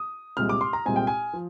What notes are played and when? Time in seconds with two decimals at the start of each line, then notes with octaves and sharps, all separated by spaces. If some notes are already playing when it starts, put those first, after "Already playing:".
Already playing: D#6
0.37 C2 A#2 G#3 C4 F6
0.49 D6
0.61 C6
0.73 A#5
0.86 C2 A#2 G#3 C4 G#5
0.96 G5
1.07 G#5
1.33 F3